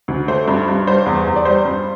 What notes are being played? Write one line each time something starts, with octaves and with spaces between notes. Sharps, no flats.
D2
A3 C5
G2
G2
G3 C5
E2
E2
D5
G3 C5
G2